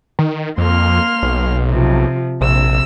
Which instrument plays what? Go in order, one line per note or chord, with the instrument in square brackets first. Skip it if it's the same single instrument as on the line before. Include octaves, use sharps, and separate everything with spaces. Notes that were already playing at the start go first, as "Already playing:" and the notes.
[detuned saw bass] D#3
[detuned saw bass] F2 [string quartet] A#3 C6 F6
[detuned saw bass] B1
[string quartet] C3 F3
[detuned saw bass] A#1 [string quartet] C3 E6